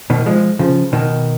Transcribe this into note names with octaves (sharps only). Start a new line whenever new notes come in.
B2 D#3
F3 G#3
C#3 F3
B2 D#3